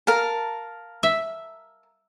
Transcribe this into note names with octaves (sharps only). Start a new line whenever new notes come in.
A#4 F5 A5
E5